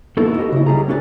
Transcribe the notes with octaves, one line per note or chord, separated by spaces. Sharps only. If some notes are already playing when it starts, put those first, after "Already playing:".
A#3 B3 D#4 E4 F#4 A4
F#4 G4 D#5
C#3 E4
C#2 G3 G#4 A#5
A3 C#4 F#4 G4 D5 G#5